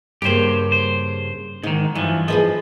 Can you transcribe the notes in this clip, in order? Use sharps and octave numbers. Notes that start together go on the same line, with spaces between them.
G2 C#3 A#3 G4 C5
C5
G#2 D#3 D#4
G2 E3 F3
F3 G#4 B4 D#5